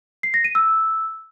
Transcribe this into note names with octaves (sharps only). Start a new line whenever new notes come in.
C7
A#6
D#7
E6